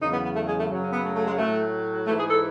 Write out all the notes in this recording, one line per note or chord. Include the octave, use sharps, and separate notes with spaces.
E2 C#3 F#3 D#4
B3
B3
A3
G#3
A3
F#2 C#3 F#3
C#4
B3
A3
A3
G#3
A2 F#3 A3
G#2 E3 A3
G#4
A4